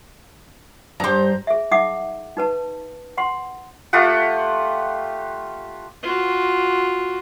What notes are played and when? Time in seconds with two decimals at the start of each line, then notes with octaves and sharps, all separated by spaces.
1.00 G2 G4 C5 A#5
1.47 G#4 E5
1.71 D#4 E5 F#5 D6 D#6
2.37 D#4 B4 A5
3.18 F#5 C6
3.93 A3 F4 G4 F#5
6.03 F4 F#4